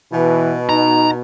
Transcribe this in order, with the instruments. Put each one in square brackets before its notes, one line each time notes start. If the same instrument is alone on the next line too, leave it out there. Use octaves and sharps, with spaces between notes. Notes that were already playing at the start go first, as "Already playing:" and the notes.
[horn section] B2 [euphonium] E3
[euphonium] D#4 [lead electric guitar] A#5